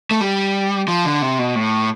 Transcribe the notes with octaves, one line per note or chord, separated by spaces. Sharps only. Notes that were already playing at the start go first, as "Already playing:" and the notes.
A3
G3
F3
D3
C3
B2
A2